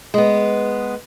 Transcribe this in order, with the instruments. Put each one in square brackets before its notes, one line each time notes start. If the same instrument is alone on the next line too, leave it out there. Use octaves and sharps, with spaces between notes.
[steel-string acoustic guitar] G#3 B3